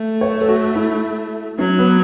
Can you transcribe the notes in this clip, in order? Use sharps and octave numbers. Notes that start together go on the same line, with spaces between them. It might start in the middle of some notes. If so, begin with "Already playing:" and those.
Already playing: A3
C#5
A4
F#4
E4
F#3 C#4
B3